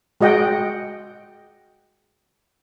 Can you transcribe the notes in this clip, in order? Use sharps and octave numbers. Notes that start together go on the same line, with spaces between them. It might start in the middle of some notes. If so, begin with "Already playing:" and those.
G#3 F#4 D#5 F#5 G5